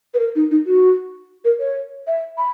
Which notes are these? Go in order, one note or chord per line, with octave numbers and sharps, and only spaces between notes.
B4
A#4
D#4
D#4
F#4
A#4
C#5
E5
B5